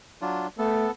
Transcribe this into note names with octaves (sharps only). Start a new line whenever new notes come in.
F#3 D4 F4
A3 B3 A4